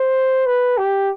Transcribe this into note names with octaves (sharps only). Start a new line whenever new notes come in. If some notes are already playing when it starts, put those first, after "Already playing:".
Already playing: C5
B4
G4